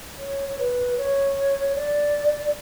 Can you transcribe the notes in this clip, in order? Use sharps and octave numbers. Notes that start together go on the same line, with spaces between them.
C#5
C#5
B4
C#5
D5